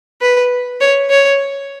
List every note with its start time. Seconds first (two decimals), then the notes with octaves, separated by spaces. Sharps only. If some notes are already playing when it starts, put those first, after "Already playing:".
0.21 B4
0.81 C#5
1.10 C#5